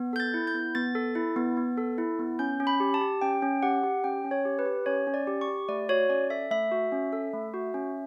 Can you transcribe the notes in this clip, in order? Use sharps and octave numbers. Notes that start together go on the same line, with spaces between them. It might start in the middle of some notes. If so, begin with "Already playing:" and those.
Already playing: B3
A4 G6
A6
E4
G6
B3
B3 A6
A4
E4
B3
B3
A4
E4
B3
C#4 G6
C#4
B5
G4
A5
G4
C#4 G5
C#4
G4 F#5
G4
C#4 G5
C#4
C#5
G4
B4
G4
C#4 C#5
C#4
D5
G4
C#6
G4
A3 D5
F#4 C#5
C#4 D5
A4 E5
A3 E5
F#4
C#4
A4
A3
F#4
C#4